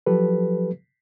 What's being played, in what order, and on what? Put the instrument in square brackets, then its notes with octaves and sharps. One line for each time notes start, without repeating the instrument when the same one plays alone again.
[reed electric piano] F3 F#3 G4 A4 B4